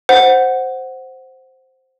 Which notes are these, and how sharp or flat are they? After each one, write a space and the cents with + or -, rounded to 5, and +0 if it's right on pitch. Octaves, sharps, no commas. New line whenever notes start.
C5 +0 F#5 +0